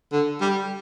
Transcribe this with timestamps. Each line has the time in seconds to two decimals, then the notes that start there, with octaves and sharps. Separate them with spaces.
0.12 D3
0.41 G3